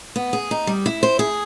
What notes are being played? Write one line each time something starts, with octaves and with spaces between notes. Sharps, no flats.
B3
G#4
D#4
G3
E4
C5
G#4